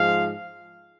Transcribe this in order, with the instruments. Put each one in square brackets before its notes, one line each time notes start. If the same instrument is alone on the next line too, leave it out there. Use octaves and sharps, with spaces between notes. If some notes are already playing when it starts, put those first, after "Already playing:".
Already playing: [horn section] G#2 F3 G#3 F5